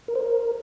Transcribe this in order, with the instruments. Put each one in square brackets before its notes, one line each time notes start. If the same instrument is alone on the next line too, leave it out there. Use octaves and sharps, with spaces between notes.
[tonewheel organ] A#4
C5
A#4